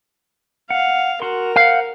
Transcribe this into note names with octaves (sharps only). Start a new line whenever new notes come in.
F5 F#5
F#4 A#4 C6
C5 F5 F#5